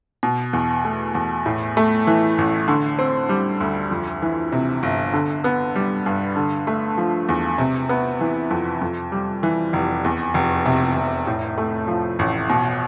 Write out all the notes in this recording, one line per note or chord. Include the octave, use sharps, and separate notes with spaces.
B2
E2
A3
E2
A2
A3
E3
A1
D3
C4
G3
D2
F2
E3
C3
G1
D3
B3
G3
G2
D3
A3
F3
E2
C3
B3
E3
F2
F2
G3
E3
F1
E2
F1
C3
F1
A2
A3
F3
A1
B2